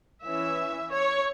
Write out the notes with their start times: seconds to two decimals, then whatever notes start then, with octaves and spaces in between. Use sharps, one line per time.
0.25 E3 C#4 E5
0.92 C#5